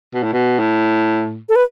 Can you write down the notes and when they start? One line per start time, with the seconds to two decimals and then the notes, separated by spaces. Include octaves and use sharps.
0.14 B2
0.23 A2
0.33 B2
0.59 A2
1.49 A4
1.56 B4